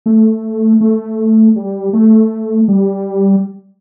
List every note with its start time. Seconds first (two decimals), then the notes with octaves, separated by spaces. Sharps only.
0.06 A3
0.81 A3
1.56 G3
1.93 A3
2.68 G3